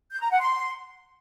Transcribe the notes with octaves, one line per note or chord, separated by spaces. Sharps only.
G6
A#5
F#5
C6